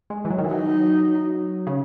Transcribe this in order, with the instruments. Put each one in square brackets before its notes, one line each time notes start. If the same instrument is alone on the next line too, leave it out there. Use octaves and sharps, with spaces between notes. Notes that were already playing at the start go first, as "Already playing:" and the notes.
[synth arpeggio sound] G#3
E3
F#3
D#3
E3
[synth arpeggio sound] F#3 [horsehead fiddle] D#4
[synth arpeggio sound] C#3